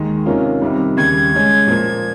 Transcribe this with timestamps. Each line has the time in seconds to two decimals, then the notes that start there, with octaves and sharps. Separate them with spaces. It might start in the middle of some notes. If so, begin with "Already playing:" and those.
Already playing: D#2 D#3 G#3
0.26 C3 D#3 A#3 C#4 F4
0.62 F2 C3 D#3 G3
0.97 D#2 C#3 G3 G#6
1.32 C#3 G#3 C#4
1.67 A#2 F3 A#3